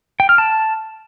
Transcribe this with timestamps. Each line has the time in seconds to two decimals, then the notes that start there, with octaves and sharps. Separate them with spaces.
0.20 G5
0.29 F6
0.38 A5